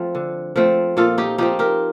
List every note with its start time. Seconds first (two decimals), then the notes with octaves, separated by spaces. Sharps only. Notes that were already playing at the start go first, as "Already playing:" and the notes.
Already playing: F3 A3 C4
0.15 D3
0.56 F3 A3 C4
0.97 A#2 F4 A4
1.18 D#4 G4
1.38 F3 C4 D#4 G4
1.59 G4 A#4